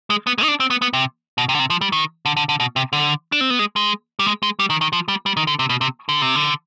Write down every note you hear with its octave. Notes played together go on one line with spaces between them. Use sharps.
G#3
B3
G#3
D#4
D4
C4
B3
B3
C3
B2
C3
D3
C3
F3
G3
D#3
D3
D3
D3
B2
C3
D3
D4
C4
B3
G#3
G#3
G3
G#3
G#3
G3
D#3
D#3
F3
G3
G3
D#3
D3
C3
B2
C3
D3
C3
D3